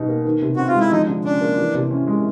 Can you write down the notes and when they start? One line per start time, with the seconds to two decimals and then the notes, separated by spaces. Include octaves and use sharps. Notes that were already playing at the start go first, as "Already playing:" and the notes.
Already playing: B2 G3 D#4
0.09 A#3
0.25 D#3
0.41 C3
0.56 C4 F#4
0.68 F4
0.75 G#3
0.80 E4
0.92 F3 D#4
1.07 D3
1.24 C#4 D4
1.41 A#3
1.58 E3
1.74 C3
1.91 C#4
2.07 G#3